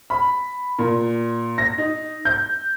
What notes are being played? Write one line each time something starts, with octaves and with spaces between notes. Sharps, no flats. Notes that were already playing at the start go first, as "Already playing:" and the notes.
B5
A#2
A#6
D#4
G6